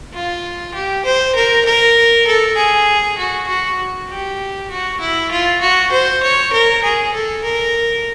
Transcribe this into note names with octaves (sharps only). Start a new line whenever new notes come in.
F4
G4
C5
A#4
A#4
A4
G#4
F#4
F#4
G4
F#4
E4
F4
F#4
C5
C#5
A#4
G#4
A4
A#4